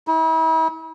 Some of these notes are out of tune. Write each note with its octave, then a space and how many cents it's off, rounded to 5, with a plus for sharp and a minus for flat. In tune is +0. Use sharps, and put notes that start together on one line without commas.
E4 -45